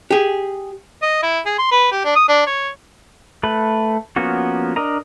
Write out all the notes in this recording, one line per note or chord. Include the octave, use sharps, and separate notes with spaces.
G4 G#4
D#5
E4
G#4
C6
B4
G4
D4
D#6
D4
C#5
A3 B4
F3 A#3 B3 C#4 F#4
D4 A#4 D#5 A#5